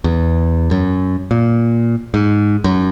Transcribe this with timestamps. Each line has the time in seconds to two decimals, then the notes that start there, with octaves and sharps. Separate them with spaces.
0.04 E2
0.71 F#2
1.31 A#2
2.14 G#2
2.64 F#2